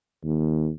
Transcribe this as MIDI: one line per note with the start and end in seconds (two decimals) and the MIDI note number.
0.24 0.71 39